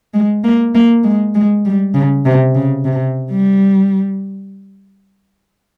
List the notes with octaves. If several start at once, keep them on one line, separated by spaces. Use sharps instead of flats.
G#3
A#3
A#3
G#3
G#3
G3
C#3
C3
C#3
C3
G3